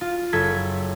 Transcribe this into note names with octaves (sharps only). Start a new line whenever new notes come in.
F4
F#1 A4 G#6 B6